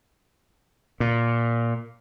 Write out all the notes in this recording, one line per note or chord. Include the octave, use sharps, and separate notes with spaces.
A#2